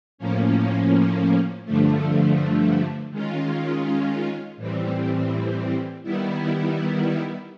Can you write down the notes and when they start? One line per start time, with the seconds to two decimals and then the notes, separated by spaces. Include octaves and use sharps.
0.18 A2 F3 A#3 C#4
1.65 G2 D3 F3 A3
3.11 D#3 G#3 C#4 F4
4.57 A2 E3 G3 C4
6.03 D#3 G3 B3 E4